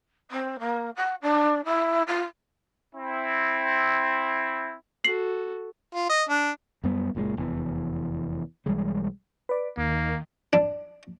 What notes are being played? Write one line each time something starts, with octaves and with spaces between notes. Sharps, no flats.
C4
A#3
F#5
D4
E4
F4
C4 E4
F#4 A4 C7 F#7
F4
D#5
D4
F#2 G3 B3
F#1 A#2 C#3 G#3
F1 E2 G2 E3
B1 E3 G3 G#3
B4 D5
D#2 D#3 A#3
D4